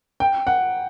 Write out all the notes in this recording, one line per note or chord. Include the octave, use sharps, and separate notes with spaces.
G5
F#5